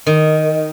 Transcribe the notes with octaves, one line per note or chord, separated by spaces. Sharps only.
D#3